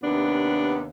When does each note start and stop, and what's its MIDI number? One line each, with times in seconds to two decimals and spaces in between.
0.02 0.86 39
0.02 0.86 48
0.02 0.86 59
0.02 0.86 62